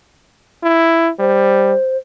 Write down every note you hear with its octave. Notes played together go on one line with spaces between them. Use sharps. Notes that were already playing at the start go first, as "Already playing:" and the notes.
E4
G3 C5